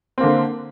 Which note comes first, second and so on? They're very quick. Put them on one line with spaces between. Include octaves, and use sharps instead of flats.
C4 A#3 D3